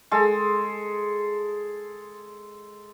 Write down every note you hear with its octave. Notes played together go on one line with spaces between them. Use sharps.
G#3 A4